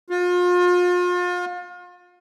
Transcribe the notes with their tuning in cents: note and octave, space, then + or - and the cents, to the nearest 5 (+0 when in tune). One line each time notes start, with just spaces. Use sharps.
F4 +35